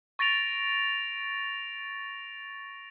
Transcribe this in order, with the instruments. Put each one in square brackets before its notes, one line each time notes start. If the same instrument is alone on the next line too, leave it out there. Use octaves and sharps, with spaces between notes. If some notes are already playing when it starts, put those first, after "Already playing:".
[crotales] C#6 A6 A#6 D7 F7